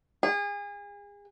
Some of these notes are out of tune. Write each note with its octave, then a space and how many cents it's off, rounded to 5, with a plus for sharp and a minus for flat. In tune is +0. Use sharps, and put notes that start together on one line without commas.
G#4 -35